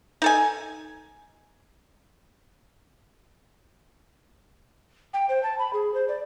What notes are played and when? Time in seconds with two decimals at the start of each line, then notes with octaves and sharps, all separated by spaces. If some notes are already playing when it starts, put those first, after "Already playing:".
0.22 D#4 A4 G#5
5.14 G5
5.29 C5
5.43 A5
5.59 B5
5.73 G#4
5.94 C5
6.08 D5